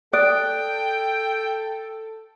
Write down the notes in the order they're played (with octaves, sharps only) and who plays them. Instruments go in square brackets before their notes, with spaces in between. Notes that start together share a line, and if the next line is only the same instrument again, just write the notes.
[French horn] A4 [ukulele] D5 [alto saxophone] G5 [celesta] D#6 F#6 D7